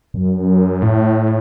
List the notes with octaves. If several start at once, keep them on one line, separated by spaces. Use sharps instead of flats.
F#2
A2